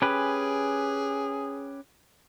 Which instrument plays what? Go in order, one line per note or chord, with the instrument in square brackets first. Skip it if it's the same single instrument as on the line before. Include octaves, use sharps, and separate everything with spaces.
[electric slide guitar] C#4 G4 B4 [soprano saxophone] G#4